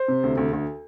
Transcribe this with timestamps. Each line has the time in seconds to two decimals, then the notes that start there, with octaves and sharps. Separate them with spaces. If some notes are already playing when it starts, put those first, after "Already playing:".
Already playing: C5
0.08 C3
0.23 D2
0.37 D2
0.52 D2